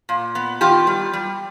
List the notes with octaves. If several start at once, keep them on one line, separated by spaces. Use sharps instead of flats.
A#2
B3
D#3 F4 G4
G3
G3